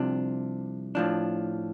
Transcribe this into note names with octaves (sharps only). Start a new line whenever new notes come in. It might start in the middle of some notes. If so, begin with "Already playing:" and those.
Already playing: C2 C3 F3 D4
A2 F3 D4